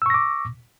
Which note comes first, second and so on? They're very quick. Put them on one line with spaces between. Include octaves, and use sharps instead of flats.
E6 C#6 A#6 D6